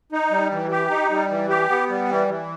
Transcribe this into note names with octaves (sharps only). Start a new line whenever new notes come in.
D#4
G3
E3
G4
D#4
G3
E3
G4
B3
G3
E3
E3